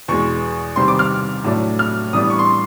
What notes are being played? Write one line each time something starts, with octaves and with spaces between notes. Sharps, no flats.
E2 B2 G#3 C#6
C3 D#3 G3 C4 C6
D6
F6
A2 F#3 A3 D4
F6
A2 E3 G3 B3 D4 D#6
C#6
C6